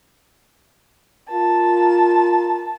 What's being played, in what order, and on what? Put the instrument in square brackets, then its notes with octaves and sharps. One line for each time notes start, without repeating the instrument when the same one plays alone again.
[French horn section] F4 A#4 [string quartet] A5